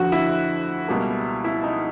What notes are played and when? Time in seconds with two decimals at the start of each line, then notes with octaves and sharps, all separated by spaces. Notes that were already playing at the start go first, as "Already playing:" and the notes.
Already playing: F2 D3 F3 F#4
0.12 E4
0.88 C#2 B2 G3 A#3
1.45 E4
1.64 D#4